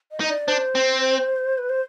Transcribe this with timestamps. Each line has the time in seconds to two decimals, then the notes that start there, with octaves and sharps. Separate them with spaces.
0.11 D#5
0.20 D#4
0.29 D5
0.47 D4 C5
0.75 C4
1.58 B4
1.69 C5